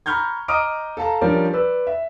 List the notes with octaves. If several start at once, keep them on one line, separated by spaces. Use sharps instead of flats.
A#5 B5 C#6 F6 G6 G#6
D#5 A#5 D6 D#6 F6 D7
A4 F5 A5 A#5
F3 G3 C#4 D4 A#4 D5
B4 D5 E6
E5